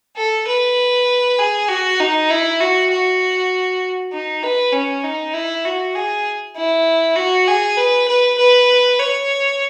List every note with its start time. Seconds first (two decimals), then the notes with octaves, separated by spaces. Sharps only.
0.17 A4
0.48 B4
1.39 G#4
1.69 F#4
2.00 D#4
2.30 E4
2.60 F#4
2.91 F#4
4.13 D#4
4.43 B4
4.73 C#4
5.04 D#4
5.34 E4
5.65 F#4
5.96 G#4
6.56 E4
7.16 F#4
7.48 G#4
7.78 B4
8.08 B4
8.38 B4
9.00 C#5